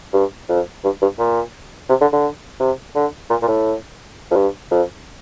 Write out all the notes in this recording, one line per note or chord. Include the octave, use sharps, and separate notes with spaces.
G2
F2
G2
G2
A#2
C3
D3
D3
C3
D3
A#2
A#2
A2
F2
G2
F2